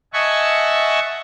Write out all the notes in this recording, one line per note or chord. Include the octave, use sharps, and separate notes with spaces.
D#5 E5 F#5 G#5 A5 C#6